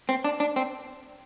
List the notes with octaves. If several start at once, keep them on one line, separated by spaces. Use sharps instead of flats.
C4
D4
D4
C4